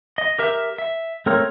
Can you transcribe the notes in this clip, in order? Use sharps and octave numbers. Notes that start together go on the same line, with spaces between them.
D#5
G4 A#4 E5
E5
A3 C4 A#4 C#5